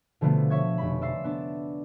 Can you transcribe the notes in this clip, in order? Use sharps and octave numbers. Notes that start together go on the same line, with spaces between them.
B2 D3 F3 A3 B3
C#5 E5 C#6 G#6
F1 B5
D5 E5 C6 E6 C7
B3 D4 D5